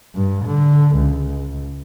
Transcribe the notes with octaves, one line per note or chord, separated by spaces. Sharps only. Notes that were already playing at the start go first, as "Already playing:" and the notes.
G2
D3
C#2